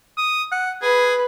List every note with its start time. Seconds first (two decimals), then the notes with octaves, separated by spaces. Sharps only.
0.18 D#6
0.52 F#5
0.82 G#4 B4